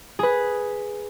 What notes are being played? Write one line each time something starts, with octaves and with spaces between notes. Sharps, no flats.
G#4 B4